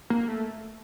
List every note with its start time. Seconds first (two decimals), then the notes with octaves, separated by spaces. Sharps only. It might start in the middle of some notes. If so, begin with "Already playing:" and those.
0.10 A#3
0.28 A3